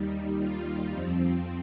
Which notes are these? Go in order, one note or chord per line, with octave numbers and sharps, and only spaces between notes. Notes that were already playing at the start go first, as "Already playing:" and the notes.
Already playing: D#2 D#3 G3
D#2 D#3 G3 F4
F2 F3 C4